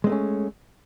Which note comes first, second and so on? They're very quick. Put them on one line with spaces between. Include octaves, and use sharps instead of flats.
G#3 C4 A3 C#4